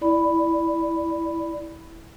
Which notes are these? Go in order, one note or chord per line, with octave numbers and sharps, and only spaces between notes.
E4 D5 B5